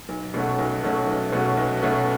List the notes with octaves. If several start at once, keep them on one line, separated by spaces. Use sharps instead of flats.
B1
B2 A3 C#4 F#4
B1
B2 A3 C#4 F#4
B1
B2 A3 C#4 F#4
B1
B2 A3 C#4 F#4